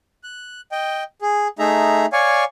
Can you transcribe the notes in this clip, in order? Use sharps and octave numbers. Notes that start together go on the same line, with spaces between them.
F#6
D#5 G5
G#4
A3 D#4 G#4 E5 A#5
C#5 D5 F5 G#5 C#6